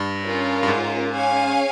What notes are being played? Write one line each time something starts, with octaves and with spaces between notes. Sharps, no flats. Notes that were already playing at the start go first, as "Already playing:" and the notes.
Already playing: G2
C#4 F4 A#4
G2
G#2
C#4 G#4 C#5 F5 G#5